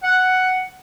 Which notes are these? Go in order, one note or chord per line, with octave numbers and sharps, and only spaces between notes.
F#5